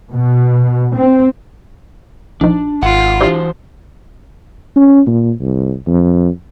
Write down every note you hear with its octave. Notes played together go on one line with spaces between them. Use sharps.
B2
C4
A#1 F3 D4 D#4
G#1 F4 F#5
E3 D4 E4 F#4 G4 C5
C#4
A#2
C2
F2